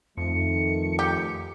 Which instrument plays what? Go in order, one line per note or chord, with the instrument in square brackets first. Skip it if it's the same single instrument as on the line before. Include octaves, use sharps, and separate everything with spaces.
[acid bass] F2 [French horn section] D#3 F3 A3 [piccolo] C#7
[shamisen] G4